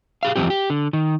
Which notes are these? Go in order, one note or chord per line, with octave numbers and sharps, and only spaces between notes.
G4 G#4 F5
E2 G2 B2 F3 C4 G4
G4
D3
D#3